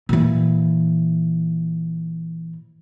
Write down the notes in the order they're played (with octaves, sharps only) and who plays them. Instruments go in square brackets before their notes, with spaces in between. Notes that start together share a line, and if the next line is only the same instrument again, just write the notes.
[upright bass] A#2 E3